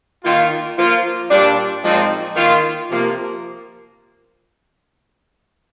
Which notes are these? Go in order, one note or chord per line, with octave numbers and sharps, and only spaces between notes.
D#3 A#3 F4
F3 A#3 F4
A#2 G3 D4
A#2 F3 G#3 C4 D#4
D#3 A#3 F4
C3 F3 A#3 F4